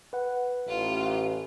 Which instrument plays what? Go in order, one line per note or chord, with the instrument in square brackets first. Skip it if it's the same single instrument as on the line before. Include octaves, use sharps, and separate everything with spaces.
[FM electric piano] B4 F#5
[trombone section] A1 [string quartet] F4